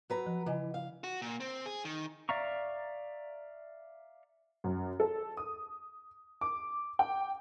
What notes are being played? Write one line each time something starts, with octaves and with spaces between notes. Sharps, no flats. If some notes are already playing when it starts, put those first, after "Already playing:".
F#3 B4 A#5
F3
C#3 E3 D#5 G#5
F5
F#4
A#2
C4
G#4
D#3
D5 E5 F5 A#5 C#6
F#2
A4
D#6
D6
G5